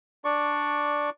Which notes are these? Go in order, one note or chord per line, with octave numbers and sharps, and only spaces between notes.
D4 D5 C#6